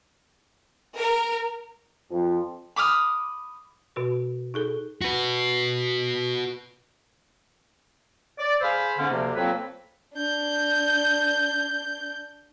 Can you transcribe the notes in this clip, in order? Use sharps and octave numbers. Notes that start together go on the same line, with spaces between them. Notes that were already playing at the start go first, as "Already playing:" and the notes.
A#4
F2 F3
B5 D6 D#6 F6
B2 F#4 B4
D#4 G#4 A4
F#4 B4
D5
G#4 C5 F5 B5 E6
G#2 D3 B3 C#4
D2 C3 F3 A#3
F2 F#3 A#3 C4 B4
D4 G6